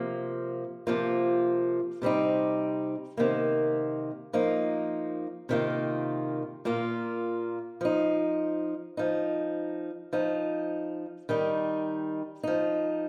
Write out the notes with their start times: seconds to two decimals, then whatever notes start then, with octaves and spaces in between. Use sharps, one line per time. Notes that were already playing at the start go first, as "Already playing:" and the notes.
Already playing: C3 F3 A#3
0.87 C3 F3 A#3 F4
2.02 C3 G3 C4 D#4
3.17 C3 D#3 A#3
4.33 F3 A#3 D#4
5.49 C3 D#3 A#3 F4
6.65 A#2 A#3 F4
7.81 F3 D#4
8.97 F3 D#4
10.13 F3 D#4
11.29 D#3 G3 D#4
12.43 F3 D#4